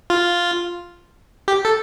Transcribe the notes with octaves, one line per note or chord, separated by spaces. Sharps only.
F4
G4
A4